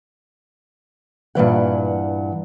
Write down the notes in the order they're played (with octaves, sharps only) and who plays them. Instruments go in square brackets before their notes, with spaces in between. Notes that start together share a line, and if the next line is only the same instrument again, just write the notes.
[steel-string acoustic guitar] G2 A#2 E3 F#5